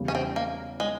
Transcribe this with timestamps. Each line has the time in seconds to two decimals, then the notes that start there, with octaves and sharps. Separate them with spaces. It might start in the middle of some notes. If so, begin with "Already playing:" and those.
Already playing: E2 C#3 G3
0.08 C#4
0.15 C4
0.36 A#3
0.80 G#3